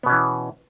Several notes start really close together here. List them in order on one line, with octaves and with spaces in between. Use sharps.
B3 B2 C#4 E3